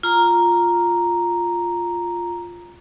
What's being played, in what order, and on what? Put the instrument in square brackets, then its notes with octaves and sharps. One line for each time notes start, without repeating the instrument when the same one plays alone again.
[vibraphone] F4 A#5